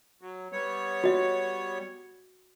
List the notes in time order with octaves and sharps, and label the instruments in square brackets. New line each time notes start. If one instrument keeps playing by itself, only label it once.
[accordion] F#3
G3 B3 C#5
[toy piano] F#4 D#5